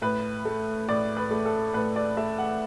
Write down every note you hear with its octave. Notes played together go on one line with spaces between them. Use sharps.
A2 B4
A3
A2 D5
B4
A3
A4
A2 B4
D5
A3 E5
F#5